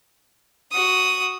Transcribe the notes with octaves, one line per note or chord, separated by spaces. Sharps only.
F#4 D#6